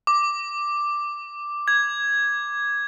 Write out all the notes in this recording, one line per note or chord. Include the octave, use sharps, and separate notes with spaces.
D6
G#6